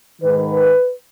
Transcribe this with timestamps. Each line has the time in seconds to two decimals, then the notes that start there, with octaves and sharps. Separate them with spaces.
0.21 G#2 D#3 B4